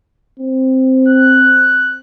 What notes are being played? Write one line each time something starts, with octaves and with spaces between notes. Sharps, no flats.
C4
F#6